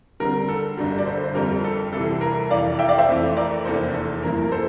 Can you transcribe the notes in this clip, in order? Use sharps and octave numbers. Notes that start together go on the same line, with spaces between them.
D3 G3 C4 A#4
A4
G1 G2 D3 G3 A#4
D5
A4 C5
C5
F2 D3 G3 C4 F4 A#4
A4
C2 C3 E3 G3 A4
A#4
F1 F2 E3 D5 F5
E5 G5
D5 F5
C5 E5
F2 E3 A3 C4
A#4 D5
F1 E2 E3 A#3 A4 C5
A4
G2 F3 A#3 E4 A#4
A#4
A4 C5